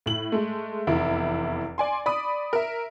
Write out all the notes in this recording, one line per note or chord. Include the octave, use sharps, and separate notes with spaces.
A2 F#7
G#3 A3
F1 E2 E4
D5 G#5 C6
D5 B5 D#6
A#4 E5